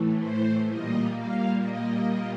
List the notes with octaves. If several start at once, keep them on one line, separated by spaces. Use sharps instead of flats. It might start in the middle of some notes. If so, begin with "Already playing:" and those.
Already playing: A2 E3 A3
C5
A#2 G3 A#3 D#5
F5
D#5